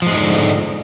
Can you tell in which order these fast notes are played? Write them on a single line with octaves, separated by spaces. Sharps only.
F3 G#3 G#2 D3